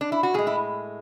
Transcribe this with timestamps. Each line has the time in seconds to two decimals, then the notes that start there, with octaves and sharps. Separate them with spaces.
0.01 D4
0.12 E4
0.23 F#4
0.34 A2 G#3 G#4
0.47 E4